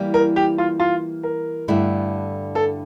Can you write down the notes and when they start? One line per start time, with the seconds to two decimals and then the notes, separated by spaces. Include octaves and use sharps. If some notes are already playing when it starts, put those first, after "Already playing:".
Already playing: E3 G3 A#3
0.14 A#4
0.36 G4
0.58 F4
0.80 F4
1.23 A#4
1.68 G2 D3 A3 E4
2.55 A4